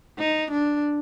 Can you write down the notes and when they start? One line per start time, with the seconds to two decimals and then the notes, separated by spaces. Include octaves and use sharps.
0.19 D#4
0.51 D4